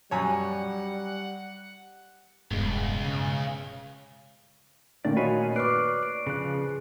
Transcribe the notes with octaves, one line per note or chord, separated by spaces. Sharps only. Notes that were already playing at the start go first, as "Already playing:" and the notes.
F#2 G3 C#5 F#5 G#5
E1 C#2 G2 B2 G#3
C#3
A#2 D#3 A3 C#4 D5
F#4 C#5 D#5 F5 G#5 B5
B4 D5 C#6 D6 F6 F#6 C7
D7
C#3 F3 G#4 F#6